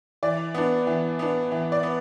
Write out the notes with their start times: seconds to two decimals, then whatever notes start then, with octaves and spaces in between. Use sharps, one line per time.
0.23 E3 D5
0.54 B3 D4
0.87 E3
1.19 B3 D4
1.52 E3
1.72 D5
1.83 B3